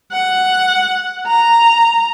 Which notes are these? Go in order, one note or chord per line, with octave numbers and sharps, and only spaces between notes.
F#5
A#5